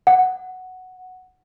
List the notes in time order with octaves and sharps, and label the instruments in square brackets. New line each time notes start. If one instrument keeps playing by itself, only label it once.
[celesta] F#5